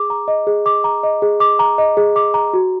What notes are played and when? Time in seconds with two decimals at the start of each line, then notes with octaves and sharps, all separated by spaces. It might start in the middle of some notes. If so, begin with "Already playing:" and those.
Already playing: G#4 D6
0.10 A#5
0.28 D#5
0.47 G#4
0.66 D6
0.84 A#5
1.03 D#5
1.22 G#4
1.40 D6
1.59 A#5
1.78 D#5
1.97 G#4
2.16 D6
2.34 A#5
2.53 F#4